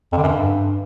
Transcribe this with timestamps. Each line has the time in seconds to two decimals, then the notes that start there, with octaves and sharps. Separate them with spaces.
0.12 F2
0.17 D3
0.23 F#2
0.28 G2